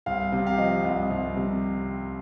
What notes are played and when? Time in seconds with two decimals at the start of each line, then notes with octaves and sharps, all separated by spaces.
0.06 C2 F5
0.32 C3
0.47 F5
0.58 F3 D#5
0.84 C2
1.11 C2
1.36 C3